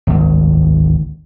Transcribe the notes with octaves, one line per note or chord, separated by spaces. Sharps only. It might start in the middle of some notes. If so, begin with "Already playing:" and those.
G#1 D2